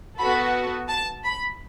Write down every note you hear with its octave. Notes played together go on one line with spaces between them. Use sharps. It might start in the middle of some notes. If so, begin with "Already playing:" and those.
B3 F#4 A4 B5
A5
B5